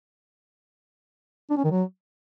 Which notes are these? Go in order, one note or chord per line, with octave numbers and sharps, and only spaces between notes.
D4
C#4
D#3
F#3